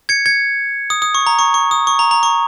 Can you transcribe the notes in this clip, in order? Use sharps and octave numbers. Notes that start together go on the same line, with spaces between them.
G#6 C#7
G#6 C#7
D#6
D#6
C#6
A#5
C#6
C#6
D#6
C#6
A#5
A#5
C#6